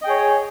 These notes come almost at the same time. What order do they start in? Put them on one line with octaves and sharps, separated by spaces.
D#5 G5 G#4 C#5